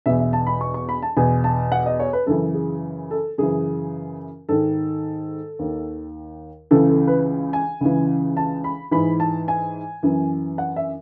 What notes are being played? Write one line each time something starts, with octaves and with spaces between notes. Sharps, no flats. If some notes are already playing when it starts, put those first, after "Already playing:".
E2 B2 E5
E5
A5
B5
C#6
C#6
B5
A5
E2 B2 G#5
A5
F#5
D#5
C#5
B4
F#2 C#3 E3 A4
G#4
A4
F#2 C#3 E3 G#4
G#2 D#3 A4
D#2 D#3
C#2 C#3 E3 A4
A4
B4
G#5
C#2 C#3 E3
A5
B5
G#2 E3 B5
A5
G#5
F#2 E3
F#5
E5